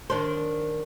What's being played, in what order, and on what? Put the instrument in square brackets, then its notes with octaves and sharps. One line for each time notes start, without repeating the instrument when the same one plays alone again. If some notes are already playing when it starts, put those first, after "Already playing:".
[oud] D#3 D4 C5